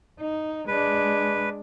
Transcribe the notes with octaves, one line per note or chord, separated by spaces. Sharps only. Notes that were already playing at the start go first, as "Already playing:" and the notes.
D#4
G#3 D4 B4